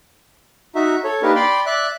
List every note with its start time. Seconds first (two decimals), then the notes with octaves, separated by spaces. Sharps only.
0.75 D#4 F#4 E5
1.04 A4 C#5
1.22 A#3 D4 D#4 G4 A#4 B4
1.35 D5 G5 B5 C6
1.66 D5 E5 F#6